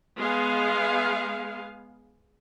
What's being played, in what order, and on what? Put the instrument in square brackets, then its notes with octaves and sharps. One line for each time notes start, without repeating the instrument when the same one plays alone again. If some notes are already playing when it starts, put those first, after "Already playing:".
[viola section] G#3 B3 G#4 F5